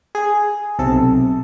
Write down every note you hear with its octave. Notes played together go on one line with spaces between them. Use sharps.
G#4
B1 C3 A4